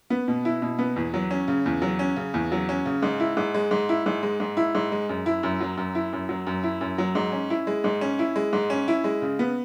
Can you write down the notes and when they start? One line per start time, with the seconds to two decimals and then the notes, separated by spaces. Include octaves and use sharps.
0.10 B3
0.28 B2
0.45 E4
0.62 B2
0.79 B3
0.96 E2
1.14 F#3
1.31 C#4
1.48 C#3
1.66 E2
1.82 F#3
1.99 C#4
2.16 C#3
2.34 E2
2.52 F#3
2.69 C#4
2.86 C#3
3.03 G#2
3.20 E4
3.37 G#2
3.54 G#3
3.71 G#2
3.89 E4
4.06 G#2
4.23 G#3
4.40 G#2
4.57 E4
4.75 G#2
4.92 G#3
5.09 F#2
5.26 E4
5.43 F#2
5.60 F#3
5.77 F#2
5.95 E4
6.13 F#2
6.29 F#3
6.47 F#2
6.63 E4
6.81 F#2
6.98 F#3
7.15 G#2
7.32 C#4
7.50 E4
7.67 G#3
7.84 G#2
8.01 C#4
8.19 E4
8.36 G#3
8.53 G#2
8.70 C#4
8.88 E4
9.04 G#3
9.22 C#3
9.39 B3